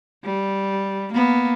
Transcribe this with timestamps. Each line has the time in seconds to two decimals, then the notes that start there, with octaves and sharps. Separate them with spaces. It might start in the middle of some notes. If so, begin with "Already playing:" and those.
0.25 G3
1.14 A#3 B3